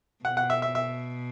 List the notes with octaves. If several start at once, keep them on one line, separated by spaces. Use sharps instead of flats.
B2 F#5
F#5
E5
E5
E5